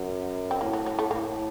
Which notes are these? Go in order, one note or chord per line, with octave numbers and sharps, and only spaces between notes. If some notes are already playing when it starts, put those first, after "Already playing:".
Already playing: F#2
C4
A2 A#3
F#3
F#3
A3
A2 A#3